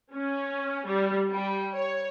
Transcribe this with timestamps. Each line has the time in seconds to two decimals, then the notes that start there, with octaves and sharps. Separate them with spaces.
0.14 C#4
0.87 G3
1.32 G3
1.73 C#5